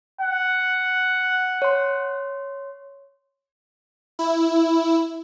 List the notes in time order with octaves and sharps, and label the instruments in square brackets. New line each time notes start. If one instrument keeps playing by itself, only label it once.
[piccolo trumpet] F#5
[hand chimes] C#5 C6
[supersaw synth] E4